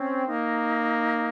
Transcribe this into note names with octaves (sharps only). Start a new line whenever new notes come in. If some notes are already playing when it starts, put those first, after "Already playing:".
Already playing: C4 C#4
A#3 D#4